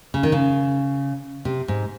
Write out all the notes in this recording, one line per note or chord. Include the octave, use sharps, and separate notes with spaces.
C#3
D#3
C#3
C3
G#2